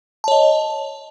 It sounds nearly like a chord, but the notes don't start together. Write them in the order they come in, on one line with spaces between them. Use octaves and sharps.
A5 C#5 D#5